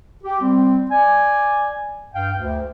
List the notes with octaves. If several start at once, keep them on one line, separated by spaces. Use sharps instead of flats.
G4
G3 C4
D5 G#5
G2 F5 G5
D2